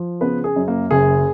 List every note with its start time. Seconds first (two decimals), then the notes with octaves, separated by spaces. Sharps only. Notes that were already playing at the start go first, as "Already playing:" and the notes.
Already playing: F3
0.21 C#3 B3 B4
0.44 G#4
0.56 F#2
0.68 A#3 A#4
0.91 F#1 G#4